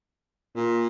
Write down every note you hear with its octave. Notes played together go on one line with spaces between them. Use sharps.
A#2